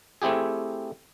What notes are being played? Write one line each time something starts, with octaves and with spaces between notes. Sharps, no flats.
A3 C4 E4 G4 G#4